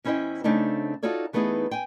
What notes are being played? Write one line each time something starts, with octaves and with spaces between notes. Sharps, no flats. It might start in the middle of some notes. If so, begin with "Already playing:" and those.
E2 C#4 E4 C5 D#5 G5
C#3 A3 C4 D4 D#4
D#4 F4 F#4 A4 C#5 D5
E3 A3 B3 D#4 E4 G#4
G5 G#5